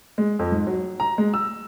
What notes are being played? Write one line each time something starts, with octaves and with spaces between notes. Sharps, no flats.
G#3
F2
G#2
F#3
A#5
G#3
E6